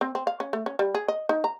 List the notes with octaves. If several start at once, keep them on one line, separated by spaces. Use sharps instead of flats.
C4
C4
F5
C#4
A3
C#4
G3
G#4
D#5
D#4
A#5